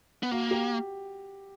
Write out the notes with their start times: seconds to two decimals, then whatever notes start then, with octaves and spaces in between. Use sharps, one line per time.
0.23 B3
0.31 A#3 F#4
0.51 G4